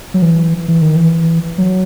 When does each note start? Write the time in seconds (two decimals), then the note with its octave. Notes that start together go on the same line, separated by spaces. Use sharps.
0.14 F#3
0.22 E3
0.68 E3
0.82 D#3
0.96 E3
1.58 F#3